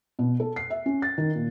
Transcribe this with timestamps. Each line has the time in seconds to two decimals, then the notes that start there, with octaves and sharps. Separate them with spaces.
0.19 B2
0.40 A4
0.56 C7
0.70 E5
0.86 C#4
1.02 A6
1.18 D#3
1.35 A#2